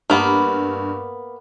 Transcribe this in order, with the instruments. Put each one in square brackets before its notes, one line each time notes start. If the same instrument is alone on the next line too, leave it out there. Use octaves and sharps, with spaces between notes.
[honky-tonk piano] G2 [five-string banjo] A#3 B3